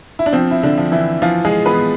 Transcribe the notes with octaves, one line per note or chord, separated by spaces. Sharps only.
E4
D4
F3 C4
E4
D3 D4
F3
E3 E4
E3 F3 F4
G#3 G#4
E3 B3 B4